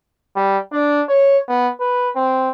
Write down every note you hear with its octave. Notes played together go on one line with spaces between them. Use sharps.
G3
D4
C#5
B3
B4
C4